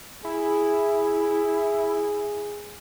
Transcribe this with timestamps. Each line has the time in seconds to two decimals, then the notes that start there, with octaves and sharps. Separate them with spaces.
0.25 E4 G#4